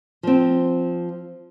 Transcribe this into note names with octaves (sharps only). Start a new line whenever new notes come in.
F3 C4